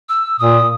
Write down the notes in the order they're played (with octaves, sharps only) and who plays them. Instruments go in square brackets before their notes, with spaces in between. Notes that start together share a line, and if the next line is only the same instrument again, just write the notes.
[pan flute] E6
[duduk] A#2 [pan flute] D#6